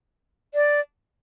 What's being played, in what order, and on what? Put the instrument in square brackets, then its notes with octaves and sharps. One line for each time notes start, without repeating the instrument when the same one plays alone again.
[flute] D5